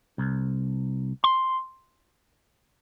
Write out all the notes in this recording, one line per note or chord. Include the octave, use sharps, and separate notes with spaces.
C2
C6